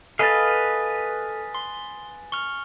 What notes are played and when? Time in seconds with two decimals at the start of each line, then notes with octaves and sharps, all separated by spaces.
0.19 A4 B4 D#5 F5 G#5 A6
1.55 C6
2.32 C#6 F6 G7